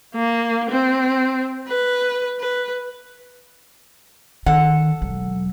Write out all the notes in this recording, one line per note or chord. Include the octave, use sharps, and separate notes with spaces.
A#3
C4
B4
B4
D#3 A4 F#5
E1 F#3